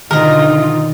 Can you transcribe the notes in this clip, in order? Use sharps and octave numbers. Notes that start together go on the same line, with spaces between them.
B2 D3 D#3 D#4 F4 A#4 D#5